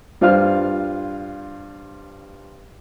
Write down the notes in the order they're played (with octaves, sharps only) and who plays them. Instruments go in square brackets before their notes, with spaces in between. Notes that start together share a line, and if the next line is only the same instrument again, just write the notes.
[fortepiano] G2 F4 C5 F5 F6